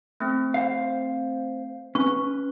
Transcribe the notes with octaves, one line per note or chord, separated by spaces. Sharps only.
A3 C4
C5 F5
C#4 B4 C#6